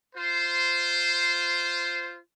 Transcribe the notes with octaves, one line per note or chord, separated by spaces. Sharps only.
F4 C5